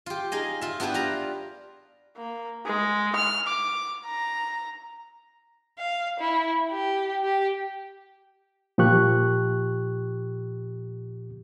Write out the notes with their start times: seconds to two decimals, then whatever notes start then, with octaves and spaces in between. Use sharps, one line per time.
0.06 F4 G4
0.32 D#4 G#4 D#5
0.61 F4 E5
0.80 B3 D4 E4 G4 B4
0.94 F4 B4 A#5
2.17 A#3
2.66 G#3
3.15 F6
3.47 D6
4.05 A#5
5.79 F5
6.19 E4
6.70 G4
7.24 G4
8.78 A#2 F3 G4 C#6 F#6